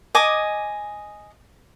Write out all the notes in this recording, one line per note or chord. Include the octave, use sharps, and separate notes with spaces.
D#5 G#5 D6